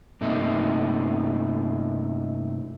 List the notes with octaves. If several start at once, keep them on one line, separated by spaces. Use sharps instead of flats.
G2 C3 A3 A#3 D#4